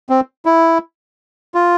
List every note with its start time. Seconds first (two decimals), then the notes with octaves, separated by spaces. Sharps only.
0.10 C4
0.46 E4
1.55 F4